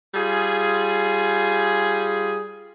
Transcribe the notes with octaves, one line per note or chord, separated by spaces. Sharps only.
G3 F4 G#4